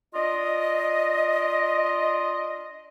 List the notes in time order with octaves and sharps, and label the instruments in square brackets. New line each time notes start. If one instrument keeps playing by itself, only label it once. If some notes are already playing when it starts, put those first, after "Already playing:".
[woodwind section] D4 F4 D#5